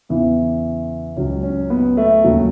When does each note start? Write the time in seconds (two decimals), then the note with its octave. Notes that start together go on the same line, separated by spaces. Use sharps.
0.09 E2 C#3 E3
1.17 C#2 C#3 F#3 C#4
1.43 C#4
1.70 B3
1.97 A3
2.24 D#2 C#3 F#3